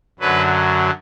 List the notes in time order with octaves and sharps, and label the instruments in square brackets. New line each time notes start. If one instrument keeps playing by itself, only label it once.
[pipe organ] F#2 D3 F#3 B4